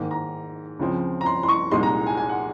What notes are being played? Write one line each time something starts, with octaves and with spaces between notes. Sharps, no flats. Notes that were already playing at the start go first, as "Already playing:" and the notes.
Already playing: G#2 D#3 A#3
A#5
C#2 C#3 F3 C4
A#5
C6
C6
C#6
C2 A#2 G#3 D#4 C6
A#5
G#5
G#5
F#5